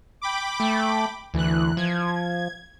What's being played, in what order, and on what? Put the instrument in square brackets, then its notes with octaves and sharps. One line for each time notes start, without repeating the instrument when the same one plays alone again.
[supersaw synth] G5 B5 D6
[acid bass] A3
[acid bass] D2 [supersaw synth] E3 F#6
[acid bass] F3 [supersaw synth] G#6